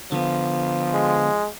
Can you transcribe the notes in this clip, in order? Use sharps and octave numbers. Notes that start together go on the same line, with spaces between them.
D3 F3 B3
G#3